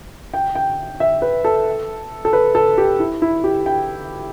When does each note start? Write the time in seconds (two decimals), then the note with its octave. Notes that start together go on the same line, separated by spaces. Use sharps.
0.34 G5
0.55 G5
1.00 E5
1.22 B4
1.44 A4
2.25 A4
2.33 B4
2.55 A4
2.78 G4
2.99 E4
3.22 E4
3.44 G4
3.66 G5